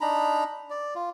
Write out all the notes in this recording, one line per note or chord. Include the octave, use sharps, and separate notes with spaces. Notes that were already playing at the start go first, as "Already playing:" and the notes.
D4 D#4 A#5 B5
D5
F4